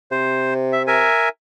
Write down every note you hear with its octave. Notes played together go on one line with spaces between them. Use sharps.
C3 C5
E5
A#4 E5 G#5